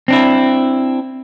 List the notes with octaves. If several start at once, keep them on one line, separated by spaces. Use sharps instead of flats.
C4 D4 E4